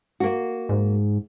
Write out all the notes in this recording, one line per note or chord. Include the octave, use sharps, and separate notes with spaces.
A#3 F#4
G#2